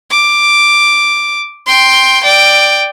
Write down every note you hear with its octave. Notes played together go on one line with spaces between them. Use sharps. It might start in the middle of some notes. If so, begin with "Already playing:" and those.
D6
G5 C6
D5 G5